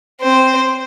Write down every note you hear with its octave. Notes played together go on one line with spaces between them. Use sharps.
C4 C5